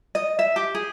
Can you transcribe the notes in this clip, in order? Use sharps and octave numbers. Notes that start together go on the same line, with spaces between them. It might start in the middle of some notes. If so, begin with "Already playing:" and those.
D#5
E5
G4
G#4